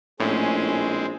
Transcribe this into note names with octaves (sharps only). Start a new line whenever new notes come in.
A#1 A2 G#3 C4 C#4